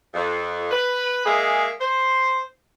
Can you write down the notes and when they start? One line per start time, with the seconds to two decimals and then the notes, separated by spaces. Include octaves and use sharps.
0.14 F2
0.71 B4
1.25 G#3 A#3 G#4 D#5 E5
1.80 C5